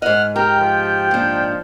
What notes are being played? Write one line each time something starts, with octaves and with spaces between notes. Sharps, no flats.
G#2 D#5 F#5 F6
G4 A#4 G5
F3
A#2 D4